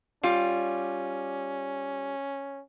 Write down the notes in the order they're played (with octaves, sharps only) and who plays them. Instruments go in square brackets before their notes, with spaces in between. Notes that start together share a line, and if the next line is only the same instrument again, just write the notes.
[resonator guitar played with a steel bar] G3 F4 [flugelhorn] C#4